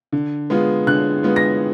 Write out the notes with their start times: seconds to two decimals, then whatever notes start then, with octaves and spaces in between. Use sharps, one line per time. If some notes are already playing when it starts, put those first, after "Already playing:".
0.12 D3
0.50 G#3 B3 F4
0.87 D3 F#6
1.23 G#3 B3 F4
1.36 A#6